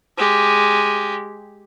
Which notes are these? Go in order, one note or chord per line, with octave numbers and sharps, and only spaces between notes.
G#3 G4